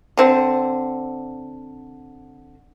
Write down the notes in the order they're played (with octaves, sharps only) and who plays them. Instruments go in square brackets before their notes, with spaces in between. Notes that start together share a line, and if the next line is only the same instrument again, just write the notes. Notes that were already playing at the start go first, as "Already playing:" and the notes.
[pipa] D3 C4